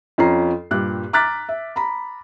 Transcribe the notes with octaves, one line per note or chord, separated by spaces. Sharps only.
F2 F3 C#4 F4 A#5 C7
G2 A#2 G4 D6 F#6
A#5 D6 F6 F#6 A6 B6
E5
A#5 B5